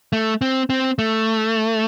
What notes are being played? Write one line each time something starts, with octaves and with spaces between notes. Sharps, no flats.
A3
C4
C4
A3